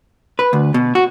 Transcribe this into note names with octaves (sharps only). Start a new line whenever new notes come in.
B4
D2
B2
F#4